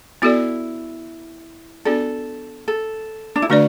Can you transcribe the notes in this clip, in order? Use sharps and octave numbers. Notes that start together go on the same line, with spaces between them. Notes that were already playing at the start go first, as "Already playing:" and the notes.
B3 E4 F#4 A4 D5
B3 D4 F#4 A4 D5
A4
D4
E4
D3 A3 D4 F#4 B4 D5